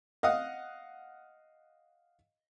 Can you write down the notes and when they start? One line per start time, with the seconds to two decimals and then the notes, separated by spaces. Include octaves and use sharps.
0.23 D#5 F5 F#5 D#6